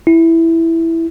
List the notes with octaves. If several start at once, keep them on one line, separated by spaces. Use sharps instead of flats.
E4